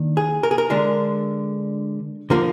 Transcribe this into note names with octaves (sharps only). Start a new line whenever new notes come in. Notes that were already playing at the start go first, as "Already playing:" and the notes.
Already playing: D#3 A#3 D4
G#4
A#4
G#4
A#4
D3 G#3 D4 A#4
D3 F3 A#3 A#4